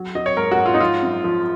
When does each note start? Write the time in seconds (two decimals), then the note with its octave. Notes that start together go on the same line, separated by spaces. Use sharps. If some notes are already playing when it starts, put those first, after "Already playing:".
Already playing: F#3
0.15 F#3 D#5
0.26 C#5
0.37 G#2 A#4
0.51 F#4
0.59 G#2
0.66 F4
0.74 D#4
0.80 F3 F4
1.02 F#2
1.24 F3